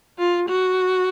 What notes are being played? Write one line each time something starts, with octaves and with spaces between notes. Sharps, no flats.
F4
F#4